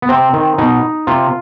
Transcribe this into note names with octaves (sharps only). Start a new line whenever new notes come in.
B3
C3 C4
D#3
B2 D#4
C3 F4